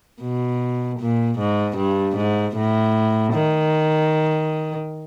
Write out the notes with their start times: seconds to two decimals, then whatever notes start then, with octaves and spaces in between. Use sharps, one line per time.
0.22 B2
1.00 A#2
1.39 G#2
1.77 G2
2.16 G#2
2.56 A2
3.34 D#3